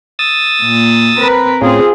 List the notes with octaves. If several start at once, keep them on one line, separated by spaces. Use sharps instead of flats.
D#6 E6 A6
A#2
C4 A#4 B4
A2 C4 C#4 F4 G#4